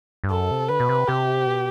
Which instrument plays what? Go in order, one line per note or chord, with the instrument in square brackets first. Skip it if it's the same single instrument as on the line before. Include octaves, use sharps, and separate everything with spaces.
[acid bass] G2
[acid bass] F#2 [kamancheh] A4
[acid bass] C3
[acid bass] D3 [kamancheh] B4
[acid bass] B2
C3
[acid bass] C3 [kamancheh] G4
[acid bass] B2